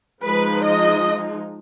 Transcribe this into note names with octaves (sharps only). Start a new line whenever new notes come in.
F3 G#3 D#4 B4
D#5